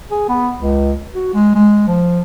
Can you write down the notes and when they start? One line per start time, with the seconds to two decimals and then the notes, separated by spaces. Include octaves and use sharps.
0.11 G#4
0.29 B3
0.58 C#2
1.15 F#4
1.34 G#3
1.55 G#3
1.88 F3